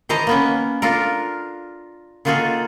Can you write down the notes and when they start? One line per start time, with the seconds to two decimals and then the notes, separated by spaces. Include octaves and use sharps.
0.09 D#3 E3 C5 D#5 A5 A#5
0.27 A#3 B3 C#4
0.82 D4 F4 A4 A#4
2.25 D#3 A#3 F4 F#4 G#4 A4